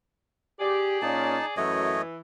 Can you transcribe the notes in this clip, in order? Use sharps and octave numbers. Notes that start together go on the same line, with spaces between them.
G4 G#4 D5
A#2 A#3 C#4 D#4 A5
F#2 E3 A3 C#5 D#5